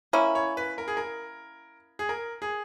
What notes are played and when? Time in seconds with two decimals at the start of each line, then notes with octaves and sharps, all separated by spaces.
0.13 A#3 C#4 E4
0.35 C#5
0.57 B4
0.78 A#4
0.88 G#4
0.97 A#4
1.99 G#4
2.09 A#4
2.42 G#4